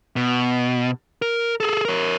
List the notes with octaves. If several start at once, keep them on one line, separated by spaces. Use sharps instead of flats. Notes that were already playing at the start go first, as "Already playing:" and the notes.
B2
A#4
G#4 A4
A#4 C#5